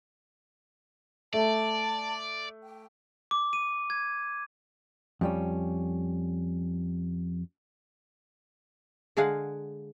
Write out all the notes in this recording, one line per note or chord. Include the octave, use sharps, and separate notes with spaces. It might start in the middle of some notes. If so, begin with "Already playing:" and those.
A3 D5 A5
G5
D6
D#7
G#6
F2 G3 C#4
D3 G#3 G#4 F5 F#5